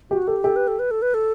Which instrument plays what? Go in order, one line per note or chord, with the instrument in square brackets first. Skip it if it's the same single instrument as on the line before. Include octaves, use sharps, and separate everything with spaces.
[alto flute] F#4 [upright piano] G4
[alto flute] G4 [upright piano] A4
[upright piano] G4 [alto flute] A4
[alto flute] B4
A4
B4
A4
B4
A4